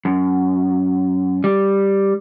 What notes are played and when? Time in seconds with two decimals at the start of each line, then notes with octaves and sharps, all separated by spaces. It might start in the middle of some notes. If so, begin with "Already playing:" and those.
0.05 F#2
1.44 G3